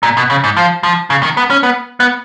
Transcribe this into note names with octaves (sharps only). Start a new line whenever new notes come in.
A#2
B2
C#3
G#2
F3
F3
C#3
D#3
B3
C#4
B3
B3